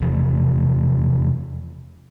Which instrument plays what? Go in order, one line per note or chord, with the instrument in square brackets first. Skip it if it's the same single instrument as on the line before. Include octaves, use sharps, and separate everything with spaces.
[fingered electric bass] F1 E2 C3 F3